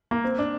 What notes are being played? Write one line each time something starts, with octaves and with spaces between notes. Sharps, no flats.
A#3
C4
D4